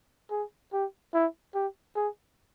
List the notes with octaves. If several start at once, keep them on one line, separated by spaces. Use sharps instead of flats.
G#4
G4
E4
G4
G#4